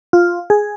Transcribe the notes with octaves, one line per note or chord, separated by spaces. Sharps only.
F4
G#4